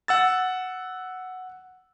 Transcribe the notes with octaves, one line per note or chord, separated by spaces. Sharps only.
F#5 E6 A6